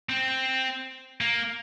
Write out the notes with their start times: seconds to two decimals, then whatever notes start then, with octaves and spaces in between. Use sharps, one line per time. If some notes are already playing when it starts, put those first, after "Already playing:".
0.09 C4
1.21 A#3